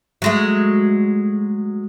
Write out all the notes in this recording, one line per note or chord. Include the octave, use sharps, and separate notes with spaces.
F#3 G#3 A3